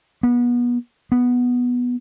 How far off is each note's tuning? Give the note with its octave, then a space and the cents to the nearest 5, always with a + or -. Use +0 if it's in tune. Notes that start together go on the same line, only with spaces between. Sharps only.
B3 -30
B3 -5